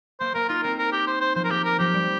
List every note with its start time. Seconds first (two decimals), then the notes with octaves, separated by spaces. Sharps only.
0.20 A#3 C5
0.34 A#3 A#4
0.49 D#4 F4
0.63 C4 A#4
0.78 A#4
0.93 G4
1.07 C5
1.21 C5
1.35 F3 C5
1.45 A#4
1.50 A#3 G4
1.64 A#4
1.79 F3 G4
1.94 G3